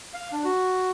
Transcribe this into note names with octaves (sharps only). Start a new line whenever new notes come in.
F5
D4
F#4